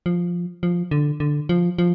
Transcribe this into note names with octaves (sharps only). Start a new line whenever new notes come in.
F3
F3
D3
D3
F3
F3